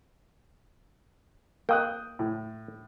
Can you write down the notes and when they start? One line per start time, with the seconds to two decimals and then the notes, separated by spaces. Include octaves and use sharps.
1.69 A#3 G5 D#6 F#6
2.19 A2